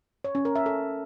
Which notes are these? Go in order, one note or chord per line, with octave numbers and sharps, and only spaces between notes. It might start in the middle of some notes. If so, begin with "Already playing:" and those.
C#5
C#4
A#4
E5
A4